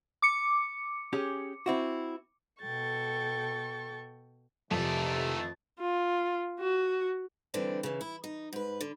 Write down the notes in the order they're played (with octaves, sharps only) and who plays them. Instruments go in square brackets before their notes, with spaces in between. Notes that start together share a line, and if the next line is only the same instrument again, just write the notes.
[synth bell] D6 C#7
[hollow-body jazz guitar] C#4 G4 G#4
C4 E4 F#4
[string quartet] B2 A4 G5 C#6 A6
[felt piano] F2 [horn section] G#2 E3 A3 [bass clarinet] C3 [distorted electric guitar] D#3 D5
[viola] F4
F#4
[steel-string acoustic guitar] D3 E3 G3 C4 D4
C#3 E3
E4
D#4
G#2 B4
D3